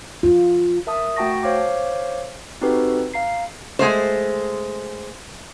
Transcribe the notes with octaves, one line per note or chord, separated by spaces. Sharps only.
F4
A#4 E5 A5 D#6
A3 F#4 G5 A5 C#6 A#6
C5 C#5 F5 D6
C4 D#4 F#4 G4 A4 B4
F5 A#5 C7
G#3 A3 C5